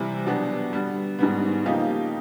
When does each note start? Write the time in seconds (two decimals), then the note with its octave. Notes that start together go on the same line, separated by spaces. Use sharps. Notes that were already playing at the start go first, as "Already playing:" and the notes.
Already playing: C3 E3 G3
0.26 B2 F#3 B3 D4 G4
0.73 D3 G3 B3
1.19 G#2 D#3 G3 B3
1.65 C#3 F3 A#3 D#4 G4